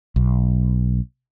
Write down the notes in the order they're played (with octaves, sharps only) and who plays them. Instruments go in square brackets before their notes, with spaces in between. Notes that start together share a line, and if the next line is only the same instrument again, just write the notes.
[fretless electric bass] B1